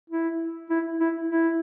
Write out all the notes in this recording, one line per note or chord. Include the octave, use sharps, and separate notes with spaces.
E4
E4
E4
E4